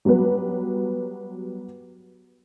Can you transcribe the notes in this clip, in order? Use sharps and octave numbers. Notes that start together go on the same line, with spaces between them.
F#3 G3 B3 F#4 B4